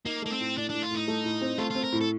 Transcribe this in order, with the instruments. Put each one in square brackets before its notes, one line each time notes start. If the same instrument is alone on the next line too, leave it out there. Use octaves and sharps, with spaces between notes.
[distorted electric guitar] A#3 [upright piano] D#4
[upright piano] A3 [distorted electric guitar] A#3
[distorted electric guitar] C4
[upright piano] A2
[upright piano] A2 [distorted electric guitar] D4
[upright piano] A2 [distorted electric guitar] D4
[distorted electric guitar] F4
[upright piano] A2 [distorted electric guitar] D#4
[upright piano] A3
A2
C4
[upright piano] A3 [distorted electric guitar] F4
[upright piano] C4 [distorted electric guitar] F4
[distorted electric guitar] A#4
[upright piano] A2
[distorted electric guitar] A4